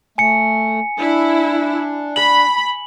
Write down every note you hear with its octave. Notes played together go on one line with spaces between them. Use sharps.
A3 G#5 C#7
D4 E4
B5 F#7